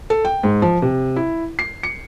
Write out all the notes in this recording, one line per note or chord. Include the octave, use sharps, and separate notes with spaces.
A4
G5
G#2
F3
C3
E4
C7
C#7